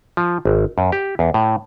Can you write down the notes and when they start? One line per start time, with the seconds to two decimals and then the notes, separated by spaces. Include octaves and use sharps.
0.17 F3
0.45 G#1
0.78 F#2
0.92 G4
1.19 E2
1.34 A2